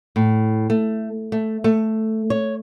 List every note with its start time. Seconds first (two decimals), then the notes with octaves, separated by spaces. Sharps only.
0.16 A2
0.70 A3
1.32 A3
1.64 A3
2.30 C#5